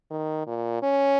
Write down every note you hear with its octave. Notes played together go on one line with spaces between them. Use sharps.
D#3
A#2
C#4